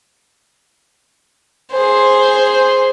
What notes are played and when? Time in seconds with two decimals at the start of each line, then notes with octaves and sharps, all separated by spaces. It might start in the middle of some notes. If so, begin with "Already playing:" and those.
1.72 G#4 C5